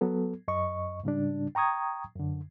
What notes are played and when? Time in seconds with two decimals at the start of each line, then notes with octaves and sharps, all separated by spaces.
0.01 F#3 B3 A4
0.48 F#2 D#5 C#6
1.04 G#2 C#3 G3 D4
1.55 G5 A#5 C#6 D#6 G#6
2.16 F#2 D3